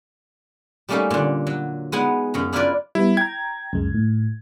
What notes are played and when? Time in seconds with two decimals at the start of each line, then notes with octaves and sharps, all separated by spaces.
0.89 G3 A3 A#3 C#4 D#4 A4
1.10 A#2 D3
1.47 F#3
1.92 G#3 B3 D#4 F#5 G#5
2.34 F#2 C#3 A#5
2.53 D4 E4 F4 A#4 B4 D5
2.95 G3 B3 E4
3.17 G5 A#5 G#6
3.73 C#2 F#2 G#3
3.94 A2